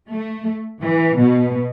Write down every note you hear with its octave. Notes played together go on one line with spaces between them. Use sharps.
A3
E3
B2